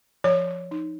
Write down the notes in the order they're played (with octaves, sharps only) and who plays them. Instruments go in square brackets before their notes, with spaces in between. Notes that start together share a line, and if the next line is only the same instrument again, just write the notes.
[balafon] F3 C#5
D#4